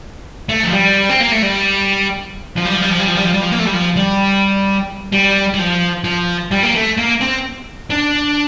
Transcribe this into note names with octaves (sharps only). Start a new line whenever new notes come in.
A3
F3
G3
C4
A#3
A3
G3
F3
G3
F3
G3
F3
G3
F3
G3
F3
G3
F3
A#3
A3
G3
F3
G3
G3
G3
F3
F3
G3
A#3
A3
A#3
C4
D4